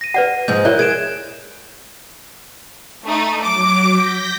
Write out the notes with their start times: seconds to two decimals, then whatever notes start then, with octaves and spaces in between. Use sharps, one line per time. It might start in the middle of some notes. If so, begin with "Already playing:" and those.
0.01 A#6 D#7
0.14 B4 D5 F#5
0.48 G#2 F3 G#3 G6
0.65 E4 A#4 C#5 D5 F#6
0.79 G#4 A#4 G#6 D7 E7
3.05 A3 D#4
3.44 F#3 D6
3.90 G6 A#6 B6